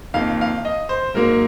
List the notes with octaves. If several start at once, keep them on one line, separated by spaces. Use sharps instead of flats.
F2 D#3 A#3 F5
F5
D#5
C5
G#2 F#3 A#3 A#4